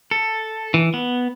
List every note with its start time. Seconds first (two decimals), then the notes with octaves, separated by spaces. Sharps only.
0.11 A4
0.74 E3
0.94 B3